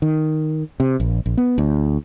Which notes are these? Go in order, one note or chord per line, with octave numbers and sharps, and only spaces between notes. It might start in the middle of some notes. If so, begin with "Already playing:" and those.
D#3
C3
A#1
A#1
B3
D2